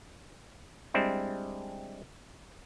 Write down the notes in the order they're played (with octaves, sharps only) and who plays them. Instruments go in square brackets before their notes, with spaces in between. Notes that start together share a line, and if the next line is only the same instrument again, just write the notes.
[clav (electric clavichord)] G3 G#3 C4 D4 E4